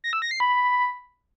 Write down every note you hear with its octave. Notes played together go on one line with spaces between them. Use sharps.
A#6
E6
A#6
C7
B5